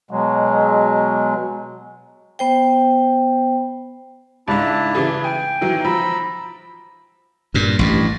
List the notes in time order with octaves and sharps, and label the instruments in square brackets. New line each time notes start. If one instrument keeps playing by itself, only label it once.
[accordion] B2 F#3 G#3
[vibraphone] B3 C5 G5
[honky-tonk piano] C#2 G#2 E5 [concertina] D4 E4 A5
[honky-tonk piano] C#3 E3 G#4
[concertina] G5 [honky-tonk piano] G#5
[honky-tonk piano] D#3 E3 F#3
[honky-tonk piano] F3 [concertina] A#5 B5 E6
[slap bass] G2 A#2
A1 G2